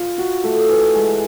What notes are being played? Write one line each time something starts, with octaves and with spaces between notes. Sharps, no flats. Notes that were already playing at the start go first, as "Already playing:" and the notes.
Already playing: F4
F#4
A3
E3
G#3